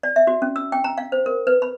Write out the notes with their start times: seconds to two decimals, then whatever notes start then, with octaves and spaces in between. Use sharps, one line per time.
0.03 D5
0.16 E5
0.27 F#4
0.42 C#4
0.56 E6
0.72 G5
0.84 A#5
0.98 F5
1.12 C5
1.26 A#4
1.47 B4
1.62 B5